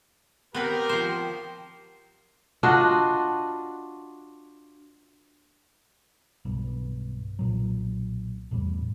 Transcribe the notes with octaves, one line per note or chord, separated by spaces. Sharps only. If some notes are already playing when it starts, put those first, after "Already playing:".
B3 C4 G4 A#4 B4
F3 C5
D4 F4 F#4 D#5
B1 G2
B1 A#2 F#3
G1 E2 A2 G3